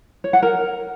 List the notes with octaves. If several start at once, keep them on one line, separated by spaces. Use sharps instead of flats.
C#5
F#5
A#4